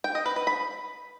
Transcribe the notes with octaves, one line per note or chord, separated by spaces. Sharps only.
G5
D#5
B4
B4
B5